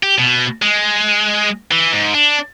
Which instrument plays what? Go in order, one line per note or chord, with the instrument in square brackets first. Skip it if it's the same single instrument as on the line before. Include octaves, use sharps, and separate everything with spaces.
[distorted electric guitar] G4
B2
G#3
E3
G#2
D4